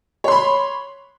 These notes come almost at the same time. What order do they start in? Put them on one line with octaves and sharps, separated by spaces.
C#5 C6 B5